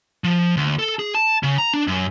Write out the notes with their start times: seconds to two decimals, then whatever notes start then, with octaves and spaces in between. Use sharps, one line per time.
0.24 F3
0.57 D2
0.79 A4
0.99 G#4
1.15 A5
1.43 C#3
1.58 A#5
1.74 D4
1.87 F#2